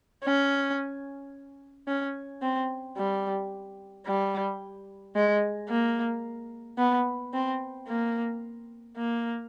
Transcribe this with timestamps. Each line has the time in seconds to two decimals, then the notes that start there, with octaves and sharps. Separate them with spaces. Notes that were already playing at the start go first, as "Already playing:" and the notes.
0.24 C#4
1.88 C#4
2.42 C4
2.97 G3
4.06 G3
5.15 G#3
5.69 A#3
6.78 B3
7.33 C4
7.88 A#3
8.97 A#3